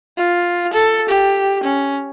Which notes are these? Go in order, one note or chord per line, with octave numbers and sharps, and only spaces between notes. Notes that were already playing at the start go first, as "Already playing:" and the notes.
F4
A4
G4
C#4